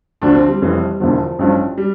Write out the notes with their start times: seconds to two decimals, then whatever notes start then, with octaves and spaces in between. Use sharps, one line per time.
0.22 D2 D3 F3 D4
0.35 C4
0.48 G3
0.61 F1 F2 E3
1.00 E1 E2 D3 F3
1.39 A1 G2 F3
1.78 G3